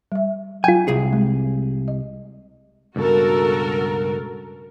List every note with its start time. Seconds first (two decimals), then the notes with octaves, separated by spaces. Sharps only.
0.12 G3 E5
0.64 F#3 F4 G5 G#5
0.88 C2 G#4
1.13 G#3
1.88 D#5
2.96 C#2 G2 B2 F#4 A4 A#4